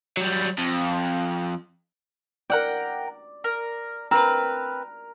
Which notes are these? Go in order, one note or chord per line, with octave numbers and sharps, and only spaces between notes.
F#3 G3
F2
A#4 D5 F#5 G5
A#4
C4 A#4 B4